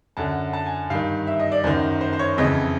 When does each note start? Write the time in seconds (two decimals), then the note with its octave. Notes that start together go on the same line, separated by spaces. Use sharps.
0.17 F#2 D3 A5
0.53 A5
0.66 G#5
0.90 G2 D#3 F5
1.27 E5
1.40 D#5
1.52 D5
1.64 F#2 D#3 C5
2.01 C5
2.13 C5
2.19 C#5
2.38 F2 C#3 E3 D#5